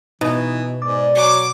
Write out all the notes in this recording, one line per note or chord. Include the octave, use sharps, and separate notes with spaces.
B2 E3 D#4
G#2 D5
F#3 D6